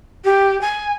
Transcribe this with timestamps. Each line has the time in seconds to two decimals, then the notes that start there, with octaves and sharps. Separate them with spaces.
0.25 G4
0.61 G#5